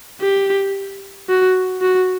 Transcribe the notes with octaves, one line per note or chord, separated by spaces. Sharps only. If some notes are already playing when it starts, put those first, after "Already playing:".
G4
F#4
F#4